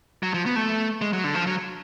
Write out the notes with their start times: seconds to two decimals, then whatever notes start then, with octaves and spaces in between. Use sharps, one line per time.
0.23 F#3
0.34 F3
0.46 B3
0.56 A3
1.01 G#3
1.13 F#3
1.24 D3
1.35 F3
1.47 F#3